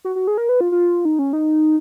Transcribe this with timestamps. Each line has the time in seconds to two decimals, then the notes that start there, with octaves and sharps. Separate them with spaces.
0.05 F#4
0.16 F#4
0.27 G#4
0.38 A#4
0.49 B4
0.61 F4
0.72 F4
1.05 D#4
1.19 C#4
1.33 D#4